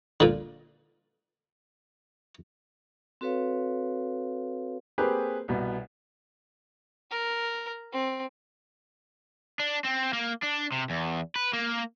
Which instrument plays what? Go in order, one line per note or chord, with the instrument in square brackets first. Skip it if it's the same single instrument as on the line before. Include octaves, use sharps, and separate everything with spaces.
[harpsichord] A#2 D3
[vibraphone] C4 F#4 A4 B4 C#5 F5
[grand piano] A#3 C4 G4 G#4 B4
C2 B2 B3
[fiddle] A#4
C4
[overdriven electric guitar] D4
C4
A#3
D4
C3
E2
B4
A#3